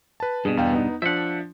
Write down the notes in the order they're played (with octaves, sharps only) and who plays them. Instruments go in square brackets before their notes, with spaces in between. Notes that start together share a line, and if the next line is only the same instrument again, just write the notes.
[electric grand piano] B4 A5
[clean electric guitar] G2 B2 [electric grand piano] G#4
[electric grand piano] E2 F5 G5
B3 D#4
[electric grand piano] F3 D4 [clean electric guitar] E5 F#5